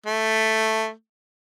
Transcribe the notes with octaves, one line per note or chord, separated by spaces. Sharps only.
A3